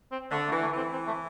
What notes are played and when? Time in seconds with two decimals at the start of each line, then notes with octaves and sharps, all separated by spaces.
0.12 C4
0.31 D3 A3
0.47 A3
0.51 E3
0.62 A3
0.72 E3 C4
0.92 C4
1.07 A3